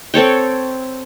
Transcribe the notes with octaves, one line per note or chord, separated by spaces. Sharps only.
C4 A4 C#5 G5